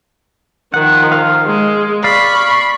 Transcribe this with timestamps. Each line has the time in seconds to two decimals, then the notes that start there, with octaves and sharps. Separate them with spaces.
0.74 D#3 F3 F#5
1.12 F5
1.46 G#3
2.04 D5 F5 B5 C#6